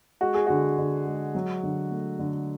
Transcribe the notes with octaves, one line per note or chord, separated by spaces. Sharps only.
G#3 F#4
G#4
D3 F#4
D3
G#3
F#3
D3
A3
D3